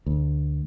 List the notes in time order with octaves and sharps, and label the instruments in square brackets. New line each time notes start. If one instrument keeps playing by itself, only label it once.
[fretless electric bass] D2